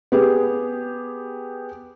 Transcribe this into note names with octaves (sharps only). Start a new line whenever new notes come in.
B3 G4 G#4